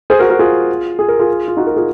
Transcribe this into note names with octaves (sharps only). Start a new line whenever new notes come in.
G#4 C5
F#4 A#4
F#4 A#4
F4 G#4
G#4
A#4
F4 G#4
F4
D#4 F#4
F#4 A#4
F4 G#4